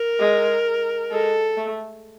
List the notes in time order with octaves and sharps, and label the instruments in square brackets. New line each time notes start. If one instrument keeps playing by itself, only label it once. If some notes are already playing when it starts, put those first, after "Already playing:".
Already playing: [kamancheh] A#4
[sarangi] G#3
[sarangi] G#3 [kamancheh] A4
[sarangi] A3